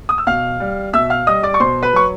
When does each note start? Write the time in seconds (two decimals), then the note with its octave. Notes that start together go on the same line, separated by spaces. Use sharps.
0.09 D#6
0.18 E6
0.27 B2 F5 F6
0.60 G3
0.93 B2 E5 E6
1.10 F5 F6
1.27 G3 D#5 D#6
1.43 D5 D6
1.54 C#6
1.60 B2 C5 C6
1.83 B4 B5
1.93 F#3 C#6